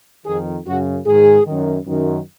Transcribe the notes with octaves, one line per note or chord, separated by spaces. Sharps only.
F2 D#3 G#4
F#2 C#3 F#4
G#2 D#3 G#4
F#2 D#3
F#2 D#3